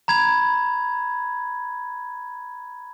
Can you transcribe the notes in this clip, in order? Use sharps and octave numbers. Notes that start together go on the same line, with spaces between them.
A#5 B5 G#6